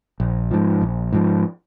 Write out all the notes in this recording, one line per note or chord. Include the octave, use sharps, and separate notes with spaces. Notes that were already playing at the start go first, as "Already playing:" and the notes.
A#1
G#2 F3
A#1
G#2 F3